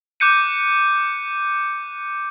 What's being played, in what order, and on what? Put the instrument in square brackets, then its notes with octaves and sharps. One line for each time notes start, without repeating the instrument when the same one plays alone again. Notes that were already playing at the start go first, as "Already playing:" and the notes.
[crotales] D6 F#6 G6 C#7 D#7